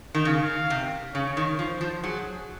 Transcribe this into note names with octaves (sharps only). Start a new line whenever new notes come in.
D#3
C#3 F5
C3
C#3 C#5
D#3
F3 C5
F3
F#3 G#4